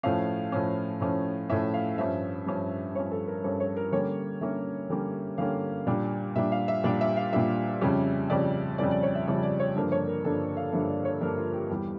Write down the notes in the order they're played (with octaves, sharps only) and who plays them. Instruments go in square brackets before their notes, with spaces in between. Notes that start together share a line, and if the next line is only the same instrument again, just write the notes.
[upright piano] A2 F3 C#4 F5
A2 F3 C#4
A2 F3 C#4
A2 F3 C#4 E5
F5
G2 F3 C#4 E5
G2 F3 C#4
G2 F3 C#4 C#5
A4
A#4
G2 F3 C#4 C#5
C#5
A#4
D3 G3 A#3 C#4 C#5
D3 G3 A#3 C#4 E5
D3 G3 A#3 C#4
D3 G3 A#3 C#4 F5
A#2 G3 D4
A#2 G3 D4 E5
F5
E5
A#2 G3 D4 D5
E5
F5
A#2 G3 D4 E5
F2 C#3 G3 C#4
F2 C#3 G3 C#4 D5
F2 C#3 G3 C#4 D5
D5
C#5
E5
F2 C#3 G3 C#4 E5
D5
C#5
G2 D3 F3 A#3 D4
C#5
A#4
G2 D3 F3 A#3 D4 A4
F5
G2 D3 F3 A#3 D4 E5
D5
C#5
G2 D3 F3 A#3 D4 A#4
F4
G4
E2 E3 G3